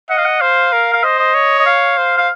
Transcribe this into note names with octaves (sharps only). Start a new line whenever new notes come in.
D#5 F#5
F5
F#5
C5 F5
A#4
F5
C5 D#5
D#5
C#5
D#5
F5
C5
F5